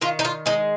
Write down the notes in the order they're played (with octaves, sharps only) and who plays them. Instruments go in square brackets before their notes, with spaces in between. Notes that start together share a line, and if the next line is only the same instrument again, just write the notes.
[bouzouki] D#3 F4
D#4
F4
G#3 D#4